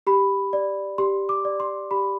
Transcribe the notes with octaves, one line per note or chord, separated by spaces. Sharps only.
G4 B5
D5
G4 C6
D6
D5
C6
G4 B5